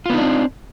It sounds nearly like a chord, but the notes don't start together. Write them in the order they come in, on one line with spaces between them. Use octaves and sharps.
F4 B3 D#4 D4 C4